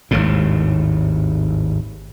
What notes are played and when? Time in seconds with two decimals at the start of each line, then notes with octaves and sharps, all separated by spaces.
0.11 G#1 D#2 A2